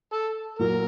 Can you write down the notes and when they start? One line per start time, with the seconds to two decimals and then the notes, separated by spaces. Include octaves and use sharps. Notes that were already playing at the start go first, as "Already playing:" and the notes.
0.13 A4
0.59 A#2 F#3 A#3 A#4